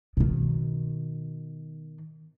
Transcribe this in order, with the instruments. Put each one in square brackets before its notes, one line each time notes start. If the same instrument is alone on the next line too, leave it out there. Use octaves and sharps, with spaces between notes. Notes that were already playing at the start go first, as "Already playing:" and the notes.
[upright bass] B2 D#3